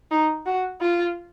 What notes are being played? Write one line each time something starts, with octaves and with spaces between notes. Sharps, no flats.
D#4
F#4
F4